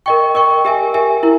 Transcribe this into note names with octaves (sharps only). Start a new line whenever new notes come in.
A#4 D#5 G5 C#6
A#4 D#5 G5 C#6
G4 A#4 E5 G#5
G4 A#4 E5 G#5
E4 A#4